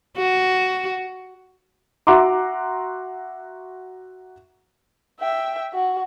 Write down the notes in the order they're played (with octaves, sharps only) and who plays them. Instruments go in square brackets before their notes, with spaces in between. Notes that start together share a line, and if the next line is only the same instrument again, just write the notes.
[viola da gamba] F#4
[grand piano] F#4 E5 F#5 A#5 C6 D6
[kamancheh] E5 G5
F#4